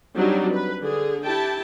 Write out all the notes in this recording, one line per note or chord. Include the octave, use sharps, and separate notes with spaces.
F#3 G3 C4 D4 D#4 G4
B4
D3 G#4
E4 G4 G5 A5